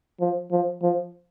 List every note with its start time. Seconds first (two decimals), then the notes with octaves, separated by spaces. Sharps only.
0.21 F3
0.52 F3
0.83 F3